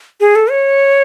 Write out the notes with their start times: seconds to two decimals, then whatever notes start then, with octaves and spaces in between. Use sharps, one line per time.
0.20 G#4
0.35 A4
0.50 C#5